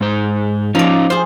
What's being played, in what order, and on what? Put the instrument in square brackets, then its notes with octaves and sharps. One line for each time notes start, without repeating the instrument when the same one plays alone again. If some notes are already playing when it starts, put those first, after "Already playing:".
[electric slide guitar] G#2 C5
[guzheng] F3 D5 [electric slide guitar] C#4 D#4 F4
[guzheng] F4 G#4 [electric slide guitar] C5